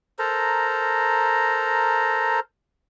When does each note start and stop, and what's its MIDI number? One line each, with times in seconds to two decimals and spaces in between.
0.19 2.40 69
0.19 2.40 70
0.19 2.40 72
0.19 2.40 82